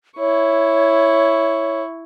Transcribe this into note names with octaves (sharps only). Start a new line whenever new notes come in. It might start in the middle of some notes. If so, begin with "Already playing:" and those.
E4 C#5 C#6